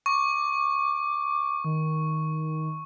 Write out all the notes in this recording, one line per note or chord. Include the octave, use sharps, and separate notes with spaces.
C#6 D6
D#3